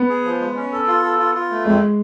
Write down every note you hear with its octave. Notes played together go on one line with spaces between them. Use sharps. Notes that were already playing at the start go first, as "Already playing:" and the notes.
Already playing: B3
G#4
F3
G#3
C#4
A4
F4
A4
F4
F4
A3
F2 G#3